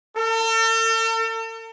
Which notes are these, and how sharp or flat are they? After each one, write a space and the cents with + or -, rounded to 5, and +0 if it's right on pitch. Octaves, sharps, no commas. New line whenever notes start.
A4 +45